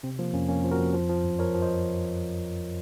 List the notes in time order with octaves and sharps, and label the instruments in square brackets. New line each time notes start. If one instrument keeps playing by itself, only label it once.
[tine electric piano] C3 C4
F3 A#3
F2 A#3 C#4
F2 A#3 C#4
F3
F#4 A#4
F2
F3
F3
F#2
F3 A#4 C#5
F3
C5 D#5